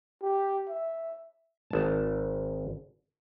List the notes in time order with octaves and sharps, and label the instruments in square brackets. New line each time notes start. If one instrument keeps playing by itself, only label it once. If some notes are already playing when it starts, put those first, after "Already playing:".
[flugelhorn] G4
E5
[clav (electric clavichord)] G#1 A5